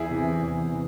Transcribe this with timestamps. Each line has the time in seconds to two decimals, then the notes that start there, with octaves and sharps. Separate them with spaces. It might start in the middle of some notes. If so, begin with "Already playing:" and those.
Already playing: E2 E4 G#4
0.11 C3 E3
0.40 E2
0.69 C3 E3